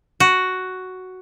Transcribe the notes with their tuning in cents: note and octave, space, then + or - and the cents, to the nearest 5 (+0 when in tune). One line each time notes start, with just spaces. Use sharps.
F#4 +5